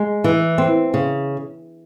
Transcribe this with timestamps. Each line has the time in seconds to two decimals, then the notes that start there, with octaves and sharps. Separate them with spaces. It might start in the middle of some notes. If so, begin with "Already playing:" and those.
Already playing: G#3
0.24 E3
0.58 C4
0.94 C#3